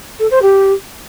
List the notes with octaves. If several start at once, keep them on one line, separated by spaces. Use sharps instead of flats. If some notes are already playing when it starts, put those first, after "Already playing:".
A4
C5
G4